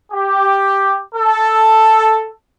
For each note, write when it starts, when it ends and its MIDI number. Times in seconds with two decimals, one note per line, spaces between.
0.13 1.01 67
1.15 2.29 69